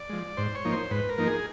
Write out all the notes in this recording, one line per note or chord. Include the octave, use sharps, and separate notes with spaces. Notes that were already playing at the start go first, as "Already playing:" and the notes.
Already playing: D5
F3 G#3
G#2 C5
C#5
F3 A#3 D#4
C5
G#2 B4
A#4
F3 A#3 D#4
G#4